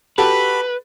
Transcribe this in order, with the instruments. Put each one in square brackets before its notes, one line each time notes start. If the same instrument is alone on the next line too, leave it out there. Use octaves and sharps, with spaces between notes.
[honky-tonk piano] F#4 G4 A4 [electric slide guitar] B4 [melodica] B5